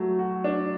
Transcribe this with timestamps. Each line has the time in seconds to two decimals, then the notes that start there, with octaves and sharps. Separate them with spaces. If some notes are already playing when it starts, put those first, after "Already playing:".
Already playing: F#3 A3
0.19 F#4
0.44 D4